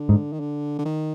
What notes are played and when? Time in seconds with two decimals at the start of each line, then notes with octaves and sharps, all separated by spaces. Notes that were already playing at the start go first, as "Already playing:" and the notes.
Already playing: D3
0.09 G#2
0.32 D#3
0.40 D3
0.78 D3
0.85 D#3